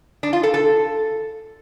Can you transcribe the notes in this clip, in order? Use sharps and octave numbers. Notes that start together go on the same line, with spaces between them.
D4
F4
A4
A4